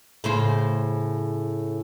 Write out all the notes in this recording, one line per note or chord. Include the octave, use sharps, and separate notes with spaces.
A2 C#3 C5